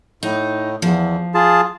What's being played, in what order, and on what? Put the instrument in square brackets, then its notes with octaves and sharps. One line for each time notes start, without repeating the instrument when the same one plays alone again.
[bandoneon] A2 [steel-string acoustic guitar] D#4
[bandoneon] E2 [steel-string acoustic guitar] F3
[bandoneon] F4 G#4 A5